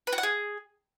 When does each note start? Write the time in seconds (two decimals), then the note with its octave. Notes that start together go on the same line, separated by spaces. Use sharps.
0.07 B4
0.13 F#4
0.18 F#5
0.23 G#4